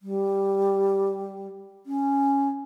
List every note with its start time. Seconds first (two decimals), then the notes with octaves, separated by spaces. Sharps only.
0.02 G3
1.86 C#4